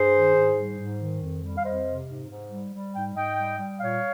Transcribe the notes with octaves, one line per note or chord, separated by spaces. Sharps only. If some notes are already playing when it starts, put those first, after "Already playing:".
Already playing: G2 G#4 C5
D#3
G#2
G3
G#2
D#3
F2
G3
F5
F2 C5 D#5
C3
G#2
G#2
G3
G3
G#2 G5
G#2 D#5 G5
G3
G3
A#2 C#5 F5